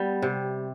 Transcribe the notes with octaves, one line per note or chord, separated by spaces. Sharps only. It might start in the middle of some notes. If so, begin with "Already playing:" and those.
Already playing: G3 B3
C3